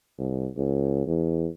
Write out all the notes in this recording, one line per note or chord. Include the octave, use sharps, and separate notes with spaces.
C2
C#2
E2